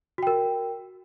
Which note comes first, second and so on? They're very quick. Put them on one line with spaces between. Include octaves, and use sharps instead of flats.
F#4 G5 A#4